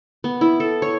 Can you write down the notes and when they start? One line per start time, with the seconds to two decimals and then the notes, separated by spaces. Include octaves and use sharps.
0.24 B3
0.41 E4
0.60 A4
0.82 C#5